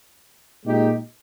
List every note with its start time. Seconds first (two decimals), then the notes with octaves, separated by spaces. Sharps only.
0.65 A#2 G#3 D#4 G4